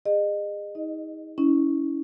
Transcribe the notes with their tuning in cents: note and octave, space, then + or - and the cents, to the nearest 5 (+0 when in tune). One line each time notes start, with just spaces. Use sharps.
G#4 -30 D#5 -30
D#4 +35 D#5 +0
C#4 +20 E4 -20